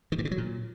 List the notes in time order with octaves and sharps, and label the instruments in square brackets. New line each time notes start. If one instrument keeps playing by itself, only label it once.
[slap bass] D#3
G2
C#3
F#3
A#2